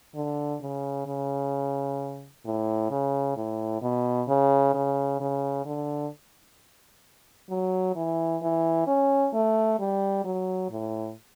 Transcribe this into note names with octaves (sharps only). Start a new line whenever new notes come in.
D3
C#3
C#3
A2
C#3
A2
B2
C#3
C#3
C#3
D3
F#3
E3
E3
C#4
A3
G3
F#3
A2